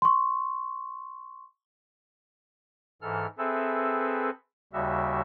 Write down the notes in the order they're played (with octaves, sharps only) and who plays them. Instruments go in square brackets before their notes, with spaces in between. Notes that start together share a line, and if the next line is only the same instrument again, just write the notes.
[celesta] C6 C#6
[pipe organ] G#2 E3 A4 F6
C4 G#4 A4 B4 E5
D#2 C#3 G3 F#4 E5